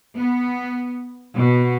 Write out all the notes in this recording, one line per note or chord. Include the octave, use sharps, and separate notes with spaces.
B3
B2